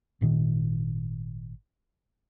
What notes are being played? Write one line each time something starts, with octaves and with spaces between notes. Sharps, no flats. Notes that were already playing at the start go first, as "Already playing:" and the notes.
G#1 A#2 D#3